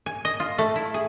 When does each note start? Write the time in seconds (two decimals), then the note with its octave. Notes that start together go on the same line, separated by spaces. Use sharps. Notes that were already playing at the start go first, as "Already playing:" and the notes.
0.06 G#5
0.25 D#5
0.40 F4
0.58 A3
0.76 E4
0.94 G#4